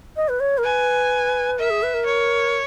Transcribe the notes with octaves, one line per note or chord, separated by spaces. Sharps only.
D#5
B4
C#5
A#4
B4 G#5
A#4 E5
G#4
B4
A#4
C#5